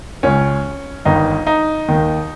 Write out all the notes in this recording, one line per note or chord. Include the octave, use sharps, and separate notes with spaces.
C#2 C#3 C#4
G1 G2 D#3 D#4
D#4
D#2 D#3